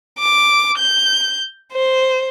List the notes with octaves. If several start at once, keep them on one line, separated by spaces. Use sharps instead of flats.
D6
G6
C5